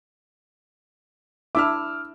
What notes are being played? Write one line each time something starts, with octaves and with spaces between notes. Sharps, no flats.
D4 E4 E5 D6 E6 F6